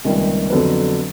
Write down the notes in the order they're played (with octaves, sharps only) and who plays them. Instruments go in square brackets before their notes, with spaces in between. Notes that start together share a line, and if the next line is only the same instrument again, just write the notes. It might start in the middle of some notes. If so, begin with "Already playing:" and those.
[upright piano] C#2 C3 D#3 G3 A#3
F2 D3 F#3 B3